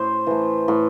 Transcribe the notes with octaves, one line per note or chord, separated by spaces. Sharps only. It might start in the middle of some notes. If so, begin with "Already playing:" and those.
Already playing: A2 C5
E3 A3
A2